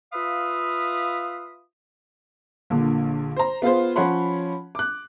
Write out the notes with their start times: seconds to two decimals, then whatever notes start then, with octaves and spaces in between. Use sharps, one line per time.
0.13 F4 B4 E5 F5 B5 D#6
2.70 A#1 A#2 D3
3.36 C5 A#5
3.62 B3 F4 G#4 C5
3.96 F3 C#4 C#5 F#5 B5 C6
4.75 D6 F#6